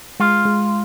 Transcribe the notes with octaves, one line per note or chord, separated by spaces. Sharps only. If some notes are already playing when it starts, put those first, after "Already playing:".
G#3 F4
G#3